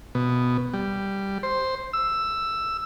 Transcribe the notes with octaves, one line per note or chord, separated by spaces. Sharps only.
B2
G3
C5
E6